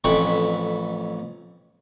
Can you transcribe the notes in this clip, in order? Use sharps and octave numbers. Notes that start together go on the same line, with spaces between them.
A1 F2 E4 B4 G5 C#6